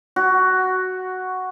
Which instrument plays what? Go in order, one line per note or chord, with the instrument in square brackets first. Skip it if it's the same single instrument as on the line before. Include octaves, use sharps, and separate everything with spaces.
[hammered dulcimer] F#4